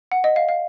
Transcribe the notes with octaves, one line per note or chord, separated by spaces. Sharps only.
F#5
D#5
F5
F5